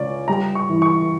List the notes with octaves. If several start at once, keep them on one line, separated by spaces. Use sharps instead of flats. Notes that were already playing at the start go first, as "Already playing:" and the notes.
Already playing: C#2 C#4 D5
G3 A#5
C#6
E3
C#6